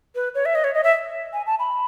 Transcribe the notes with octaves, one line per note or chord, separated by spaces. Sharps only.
B4
C#5
E5
D#5
C#5
D#5
E5
G#5
A5
B5